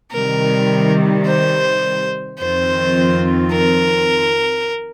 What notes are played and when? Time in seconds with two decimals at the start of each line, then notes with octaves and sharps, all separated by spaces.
0.11 C3 D#3 G3 A#4
1.26 C5
2.38 F2 D#3 C4 F4 C5
3.52 A#4